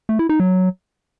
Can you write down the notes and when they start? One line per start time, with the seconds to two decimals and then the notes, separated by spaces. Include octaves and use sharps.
0.09 A3
0.19 E4
0.29 D#4
0.40 F#3